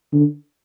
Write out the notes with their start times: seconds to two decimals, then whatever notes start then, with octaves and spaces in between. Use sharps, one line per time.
0.13 D3